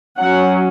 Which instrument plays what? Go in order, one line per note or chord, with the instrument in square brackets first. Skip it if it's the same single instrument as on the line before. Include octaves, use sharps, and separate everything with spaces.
[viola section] F#3 C#4 F#5